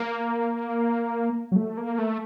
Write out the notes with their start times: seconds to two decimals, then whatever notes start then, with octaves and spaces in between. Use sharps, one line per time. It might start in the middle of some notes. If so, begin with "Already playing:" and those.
Already playing: A#3
1.52 F#3
1.56 A3
1.77 A#3
1.99 A3